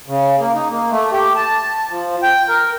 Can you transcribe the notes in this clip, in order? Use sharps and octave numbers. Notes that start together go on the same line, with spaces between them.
C#3
A#3
D#4
A#3
A3
G4
A5
F3
G5
A#4